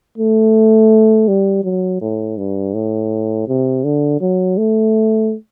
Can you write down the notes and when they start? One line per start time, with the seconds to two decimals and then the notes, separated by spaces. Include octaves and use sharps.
0.18 A3
1.28 G3
1.64 F#3
2.01 A2
2.38 G2
2.74 A2
3.48 C3
3.84 D3
4.21 F#3
4.58 A3